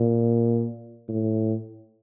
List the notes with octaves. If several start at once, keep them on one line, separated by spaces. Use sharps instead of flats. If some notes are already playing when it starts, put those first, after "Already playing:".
Already playing: A#2
A2